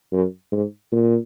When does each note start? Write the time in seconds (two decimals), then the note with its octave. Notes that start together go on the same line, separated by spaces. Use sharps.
0.12 F#2
0.52 G#2
0.92 A#2